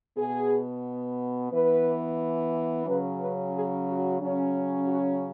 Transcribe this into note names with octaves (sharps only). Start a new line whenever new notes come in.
B2 B3 G#4
E3 B3 B4
C#3 F#3 C#4 B4
B4
G#4
F#4
C#3 F#3 C#4
F#4